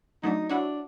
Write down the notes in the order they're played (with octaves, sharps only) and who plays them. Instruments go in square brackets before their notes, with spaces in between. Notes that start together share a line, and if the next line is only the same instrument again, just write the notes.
[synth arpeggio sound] F#3 A3 D4 [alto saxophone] D#4
[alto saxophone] D4 [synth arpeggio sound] E4 F#4 C#5